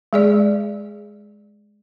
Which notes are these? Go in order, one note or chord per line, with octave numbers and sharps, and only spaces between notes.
G#3 G#4 D5